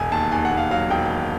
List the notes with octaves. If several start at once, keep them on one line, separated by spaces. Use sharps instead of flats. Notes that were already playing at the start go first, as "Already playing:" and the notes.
Already playing: E1 G#5
D#2 A5
D#2 G#5
F#5
D#2
F5
F#3 F5
E1 G5
D#2